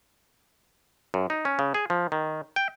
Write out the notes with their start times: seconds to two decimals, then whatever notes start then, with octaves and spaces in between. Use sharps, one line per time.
1.14 F#2
1.30 D#4
1.45 C#4
1.59 C#3
1.74 G#4
1.90 F3
2.12 D#3
2.56 G5